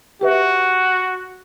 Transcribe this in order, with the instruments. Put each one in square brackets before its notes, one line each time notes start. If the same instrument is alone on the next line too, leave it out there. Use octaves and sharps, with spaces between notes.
[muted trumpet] F#4 [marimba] G4 B4 E5